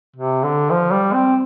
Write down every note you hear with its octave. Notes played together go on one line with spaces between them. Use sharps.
C3
D3
F3
G3
C4